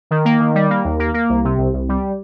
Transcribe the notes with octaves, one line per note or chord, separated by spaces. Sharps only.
D#3
A#3
D#3
G3
A#3
D#2
A#3
A#3
C2
C3
C2
C2
G3